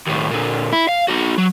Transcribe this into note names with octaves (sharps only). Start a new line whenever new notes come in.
D#2 A2
A#2 D3
E4
F5
D#4 F#4
F#3